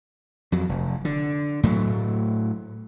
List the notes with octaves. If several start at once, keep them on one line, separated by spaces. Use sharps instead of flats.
F2 F#3
F1
D3
A2 F#3 A3